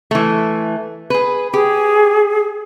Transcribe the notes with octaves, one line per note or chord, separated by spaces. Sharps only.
E3 A3
G#4 B4
G4 G#4